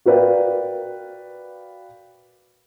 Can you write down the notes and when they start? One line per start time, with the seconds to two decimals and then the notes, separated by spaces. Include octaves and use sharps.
0.05 F#4 A#4 B4 D5 F5 G5